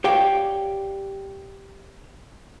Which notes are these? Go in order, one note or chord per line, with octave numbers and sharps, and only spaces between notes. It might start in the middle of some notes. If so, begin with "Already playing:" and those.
G4 C#5 D5 F5 G5